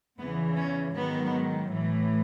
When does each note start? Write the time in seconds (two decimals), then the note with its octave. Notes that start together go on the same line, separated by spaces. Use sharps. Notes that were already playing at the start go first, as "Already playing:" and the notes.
0.19 E2 C#3 E3 B3
0.57 C#4
0.95 G#2 D#3 F#3 B3
1.71 A2 E3